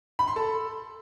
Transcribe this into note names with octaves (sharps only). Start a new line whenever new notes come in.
B5
C6
A4